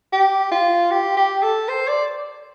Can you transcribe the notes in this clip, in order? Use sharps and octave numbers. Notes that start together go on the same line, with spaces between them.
G4
F4
G4
G4
A4
C5
D5